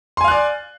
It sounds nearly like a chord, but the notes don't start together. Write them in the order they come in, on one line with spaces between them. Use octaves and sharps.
C6 G#5 F5 F#6 D5